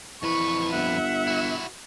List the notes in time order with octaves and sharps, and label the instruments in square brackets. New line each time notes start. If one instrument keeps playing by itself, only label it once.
[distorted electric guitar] F2 B4 [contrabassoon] E3 [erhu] C#6
[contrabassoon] G1 [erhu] E5 [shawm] F#5
[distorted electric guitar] E4 F#4